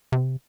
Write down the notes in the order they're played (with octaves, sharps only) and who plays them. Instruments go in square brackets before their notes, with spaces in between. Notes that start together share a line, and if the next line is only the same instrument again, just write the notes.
[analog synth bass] C3